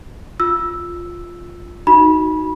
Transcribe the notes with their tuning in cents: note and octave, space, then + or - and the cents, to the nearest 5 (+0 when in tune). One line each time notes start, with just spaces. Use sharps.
F4 +0 E6 +0
D#4 +0 F#4 +0 B5 -25